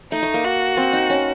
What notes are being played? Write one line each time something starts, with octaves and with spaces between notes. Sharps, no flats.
A3 D#4
A3
A#3
F#4
C4
D#4
C#4